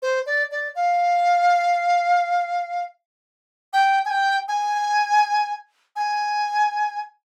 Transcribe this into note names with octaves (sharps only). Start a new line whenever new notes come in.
C5
D5
D5
F5
G5
G#5
G5
G#5
G#5